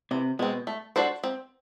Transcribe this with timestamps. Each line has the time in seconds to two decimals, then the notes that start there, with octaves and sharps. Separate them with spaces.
0.11 C3 E3
0.39 B2 G#3 C4
0.67 A3
0.96 D4 F#4 A4 C5
1.24 C4